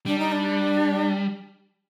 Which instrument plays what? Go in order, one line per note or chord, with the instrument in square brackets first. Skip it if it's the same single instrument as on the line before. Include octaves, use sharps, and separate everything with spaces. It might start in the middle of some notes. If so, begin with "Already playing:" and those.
[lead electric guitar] G3 [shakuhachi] D4
[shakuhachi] D#4
D4